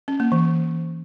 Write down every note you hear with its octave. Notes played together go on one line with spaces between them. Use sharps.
C#4
A#3
E3